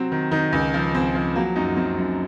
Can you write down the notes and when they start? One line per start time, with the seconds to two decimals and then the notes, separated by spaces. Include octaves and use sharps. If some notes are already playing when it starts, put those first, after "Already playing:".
Already playing: C3 F#3 C4
0.12 D#3
0.31 D#3 D#4
0.53 C#2
0.74 F3
0.94 C#2 C4
1.15 F3
1.36 F#3 A#3
1.56 F#2 D#4
1.76 F#2 C4
1.98 F#2